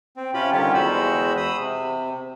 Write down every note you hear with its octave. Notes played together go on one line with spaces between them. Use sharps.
C4
C3 C#4 F4 G4 B5
D3 D#3 G3 C#4 F4 G4
E2 G#3 F#4 C5 B5 E6
B5 D#6 E6
C3